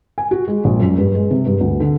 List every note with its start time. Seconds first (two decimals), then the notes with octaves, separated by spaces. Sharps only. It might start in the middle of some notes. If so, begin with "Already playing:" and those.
0.18 G#5
0.31 F#4
0.48 G#3
0.64 A#1
0.80 F#2
0.98 G2
1.15 G#3
1.31 C3
1.46 G2
1.61 D2
1.80 D3